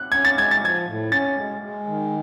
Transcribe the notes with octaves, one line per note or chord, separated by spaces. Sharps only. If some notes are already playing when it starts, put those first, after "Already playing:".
Already playing: F#6
C#4 G#6
A6
G#3 G#6
A6
F3 G#6
A2
C#4 A6
G#3
G#3
D#3